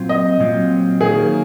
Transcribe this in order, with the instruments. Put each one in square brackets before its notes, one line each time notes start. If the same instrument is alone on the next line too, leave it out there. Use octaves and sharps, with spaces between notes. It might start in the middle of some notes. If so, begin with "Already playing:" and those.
Already playing: [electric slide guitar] A#2 F#3 C4 F4
[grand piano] D#5
[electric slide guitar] A#2 F#3 C4 F4
[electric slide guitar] D#3 F#3 A#3 [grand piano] G#4